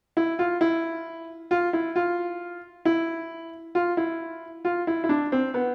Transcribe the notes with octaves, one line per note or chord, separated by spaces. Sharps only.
E4
F4
E4
F4
E4
F4
E4
F4
E4
F4
E4
E4
D4
C4
B3